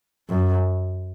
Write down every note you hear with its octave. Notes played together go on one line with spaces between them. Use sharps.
F#2